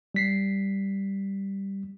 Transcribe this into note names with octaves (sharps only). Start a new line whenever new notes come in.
G3 B6 C7